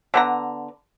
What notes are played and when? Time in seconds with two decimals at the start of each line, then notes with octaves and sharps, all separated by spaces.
0.14 D3 B3 A#5